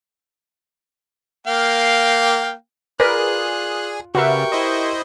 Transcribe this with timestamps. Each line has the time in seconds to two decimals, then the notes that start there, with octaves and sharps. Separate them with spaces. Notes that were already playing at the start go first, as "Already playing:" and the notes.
1.47 A#3 F5 G5
3.00 F4 G#4 A#4 B4 D5 F#6
4.15 C#3 F#4 G4 A#4 B4 E5 G5 C#6
4.52 E4 C5 D#5